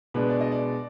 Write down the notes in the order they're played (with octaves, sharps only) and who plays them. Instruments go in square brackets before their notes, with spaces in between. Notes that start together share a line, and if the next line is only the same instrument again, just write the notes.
[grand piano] B2 G#3 D4 B4
D5
D#5
D5